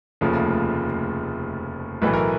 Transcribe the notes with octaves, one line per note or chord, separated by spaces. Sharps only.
F1 D#2 C#3 F3 A3
B1 A2 E3 A3 B4
A#4